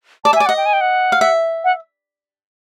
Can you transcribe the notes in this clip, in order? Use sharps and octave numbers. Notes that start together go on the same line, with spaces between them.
D5 A5
E5
G#5
D5
F#5
D#5
G5
G#5
G5
F#5
F5
E5
F#5